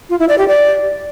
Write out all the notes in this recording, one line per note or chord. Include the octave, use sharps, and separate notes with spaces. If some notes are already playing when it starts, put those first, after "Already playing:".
F4
E4
D5
G4
D5